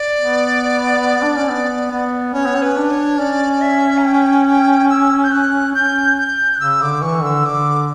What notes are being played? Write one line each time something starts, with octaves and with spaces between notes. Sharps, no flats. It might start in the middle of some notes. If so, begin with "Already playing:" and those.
Already playing: D5
B3
D4
C#4
B3
B3
C#4 C#5
B3
C#4 B4
D4
C#5
C#4 D5
D5
E5
A#5
G5
G5
E6
G6
F#6
C#4 G6
G6
F#6
C#3 E6
D3 D6
E3 C#6
D3 E6
D3 D6